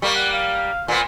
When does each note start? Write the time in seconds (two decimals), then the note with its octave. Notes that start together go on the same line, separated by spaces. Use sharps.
0.02 G3 A#3 C#6
0.15 F#5
0.32 F5
0.88 A#2 B3 C5